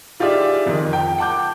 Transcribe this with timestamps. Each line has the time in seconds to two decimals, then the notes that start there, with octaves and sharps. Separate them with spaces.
0.20 D#4 F4 G4 G#4 D5 E5
0.66 F2 D#3
0.93 G5
1.18 F#5 A5 D6 G6